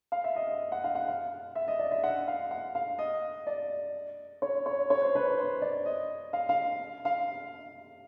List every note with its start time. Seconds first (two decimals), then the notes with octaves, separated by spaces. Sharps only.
0.12 F5
0.24 E5
0.36 D#5
0.48 D#5
0.72 F#5
0.84 F5
0.95 F#5
1.08 F5
1.55 E5
1.68 D#5
1.79 D5
1.92 E5
2.03 F#5
2.28 F5
2.51 F#5
2.75 F5
2.99 D#5
3.47 D5
4.42 C#5
4.66 C#5
4.90 C#5
5.02 C5
5.15 B4
5.25 C5
5.38 C5
5.62 D5
5.86 D#5
6.33 F5
6.49 F5
7.05 F5